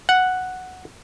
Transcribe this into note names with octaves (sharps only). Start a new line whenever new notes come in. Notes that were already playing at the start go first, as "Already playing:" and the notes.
F#5